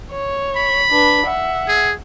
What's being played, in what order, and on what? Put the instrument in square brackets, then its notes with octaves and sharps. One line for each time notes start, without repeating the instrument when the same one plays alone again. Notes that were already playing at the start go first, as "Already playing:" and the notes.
[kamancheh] C#5
[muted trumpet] B5
[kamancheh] D4 B4
E5 F#5
[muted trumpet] G#4